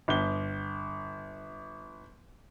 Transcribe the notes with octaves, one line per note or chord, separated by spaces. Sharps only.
G1 G7